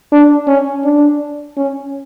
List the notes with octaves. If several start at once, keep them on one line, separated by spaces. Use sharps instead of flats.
D4
C#4
D4
C#4